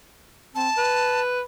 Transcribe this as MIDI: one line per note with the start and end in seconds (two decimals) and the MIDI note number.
0.55 0.69 60
0.55 1.21 81
0.77 1.42 71